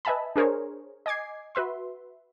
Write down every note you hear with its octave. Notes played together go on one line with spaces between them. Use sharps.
B4 D#5 E5 G#5 A5 B5
D4 G#4 A#4 C5 C#5
D#5 G#5 D6 G#6 C7
F#4 B4 E5 C6